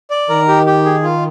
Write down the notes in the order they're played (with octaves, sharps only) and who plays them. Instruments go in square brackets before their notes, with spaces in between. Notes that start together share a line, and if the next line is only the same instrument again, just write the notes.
[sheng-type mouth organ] D5
[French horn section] D#3 [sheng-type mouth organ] A#4
[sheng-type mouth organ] G4
G4
G#4
F4